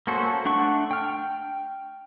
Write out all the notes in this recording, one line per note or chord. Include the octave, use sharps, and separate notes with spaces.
A#3 C#4 F#4 A4 C5
A3 D4 F#5 C#6
G5 F6